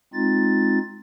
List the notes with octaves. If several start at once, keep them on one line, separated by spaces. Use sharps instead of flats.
G#3 C4 D#4 F4 A6